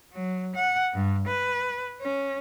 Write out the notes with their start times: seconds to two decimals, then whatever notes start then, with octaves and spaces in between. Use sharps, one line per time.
0.13 F#3
0.56 F#5
0.94 G2
1.27 B4
2.01 C#4